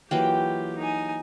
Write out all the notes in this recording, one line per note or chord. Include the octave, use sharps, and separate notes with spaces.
E3 F#3 A#3 F4 G4 G5
D#4 G#5